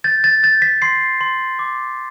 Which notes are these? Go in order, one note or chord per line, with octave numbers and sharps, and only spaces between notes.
G6 A6
A6
G6 A6
B6
C6 C7
C6
D6